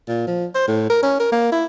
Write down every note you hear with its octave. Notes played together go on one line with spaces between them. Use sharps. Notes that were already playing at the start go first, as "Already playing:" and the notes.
A#2
F3
C5
A2
A#4
C#4
A#4
A#3
E4